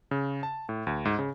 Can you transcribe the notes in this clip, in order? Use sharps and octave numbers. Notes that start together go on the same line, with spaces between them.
C#3
A5
A2
D2
G#2
C#3